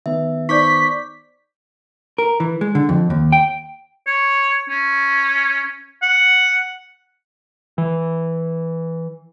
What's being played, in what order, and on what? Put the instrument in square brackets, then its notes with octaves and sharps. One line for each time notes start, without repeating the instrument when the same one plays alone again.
[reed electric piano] D#3 B3 [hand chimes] E5
[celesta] D#4 C5 D5 [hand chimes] C#6 D6 G6 [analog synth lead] B6
[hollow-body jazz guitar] A#4
E3
G#3
D3
F2
D#2
G5
[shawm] C#5
C#4
F#5
[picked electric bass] E3